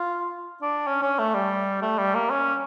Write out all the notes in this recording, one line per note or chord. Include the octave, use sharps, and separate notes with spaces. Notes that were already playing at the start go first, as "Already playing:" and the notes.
Already playing: F4
D4
C#4
C#4
A3
G3
A3
G3
A#3
C#4